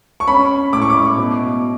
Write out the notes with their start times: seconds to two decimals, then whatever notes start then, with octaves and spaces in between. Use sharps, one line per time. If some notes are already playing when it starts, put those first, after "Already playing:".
0.20 C#6
0.28 C#4 B5
0.73 A2 D6
0.82 C#6
0.90 D6
1.17 B2